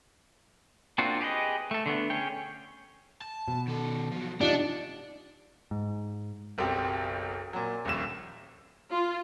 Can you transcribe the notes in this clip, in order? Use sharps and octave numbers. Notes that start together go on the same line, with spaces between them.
A#3 C4 D4 F4 F#4
G4 G#4 B4 D#5
A3 A4
D3 A3 B3
C#4 G#4 C#5 G5
A5
B2
D#3 A4
F3 F#3
C3 D4 D#4 F4 G4 F#5
G#2
F#1 B1 C4 G4
A#2 F#3
D#1 A#1 D#2 E7
F4